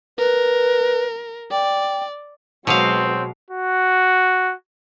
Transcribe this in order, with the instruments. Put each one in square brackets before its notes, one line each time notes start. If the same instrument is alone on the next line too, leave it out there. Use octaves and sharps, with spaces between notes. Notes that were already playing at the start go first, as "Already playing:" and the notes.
[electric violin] A#4 [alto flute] B4
[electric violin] D5 [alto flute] G5
[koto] B2 F5 [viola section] F#3 G#3 B4 [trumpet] C4
[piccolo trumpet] F#4